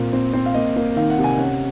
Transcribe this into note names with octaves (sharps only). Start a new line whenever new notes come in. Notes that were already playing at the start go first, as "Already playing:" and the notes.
Already playing: A#2 C4 A#4
C4
C4
F5
A#3 D#5
A#3
D#3 F5
F#5
C3
G#5
C#4 F#5